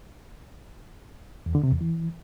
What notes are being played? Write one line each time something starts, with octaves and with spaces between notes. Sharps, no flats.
E2
D3
C3
E2
E3